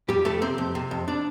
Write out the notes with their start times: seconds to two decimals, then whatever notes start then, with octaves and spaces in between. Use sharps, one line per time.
0.08 F2 G3 G4
0.25 F2 A3 A4
0.42 C3 C4 C5
0.58 F2
0.75 C3
0.91 F2
1.08 D4 D5